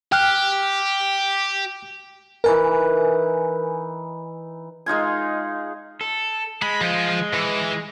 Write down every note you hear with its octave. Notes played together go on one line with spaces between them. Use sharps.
G4 G5 F6 F#6
E3 D#4 A#4 B4 G#5
G#3 D#4 F4 G#5
A4
G#3 B5
F3
E3